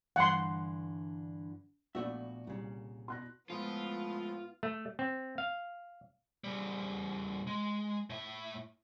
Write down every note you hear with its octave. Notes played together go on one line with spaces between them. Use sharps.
G2 D3 E3 F#5 C6
A#1 A#2 A3 B3 F#4 D5 E5
C2 A#2 C#3
B2 C6 F#6 A#6
A2 F3 G#3 A3 B3 F4 D#6
A3
C4
F5
C#3 G3
G#3
A2 E5